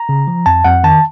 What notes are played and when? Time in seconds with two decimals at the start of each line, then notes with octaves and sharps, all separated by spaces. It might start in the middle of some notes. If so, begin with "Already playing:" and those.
Already playing: A#5
0.09 C#3
0.28 F3
0.46 F2 A5
0.64 F2 F#5
0.84 D#3 A5